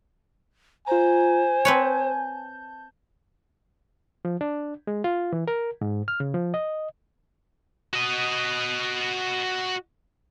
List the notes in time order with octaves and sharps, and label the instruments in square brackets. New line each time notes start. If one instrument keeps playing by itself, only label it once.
[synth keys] F4 A#5 [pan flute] C5 [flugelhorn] G#5
[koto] C4 B4 C#5 [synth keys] A5 G6
[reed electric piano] F3
D4
G#3
F4
E3
A#4
G#2
F6
C#3
F3
D#5
[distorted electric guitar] F#4 D#5